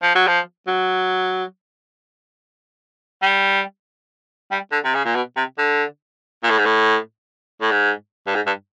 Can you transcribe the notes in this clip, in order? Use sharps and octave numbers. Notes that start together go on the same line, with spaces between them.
F3
F#3
F3
F#3
G3
G3
D3
C3
C#3
A#2
B2
C3
D3
A#2
A2
G#2
A2
A2
G#2
G2
G#2
G2